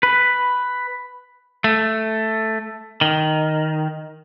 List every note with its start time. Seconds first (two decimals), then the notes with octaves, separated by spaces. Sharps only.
0.03 B4
1.64 A3
3.01 D#3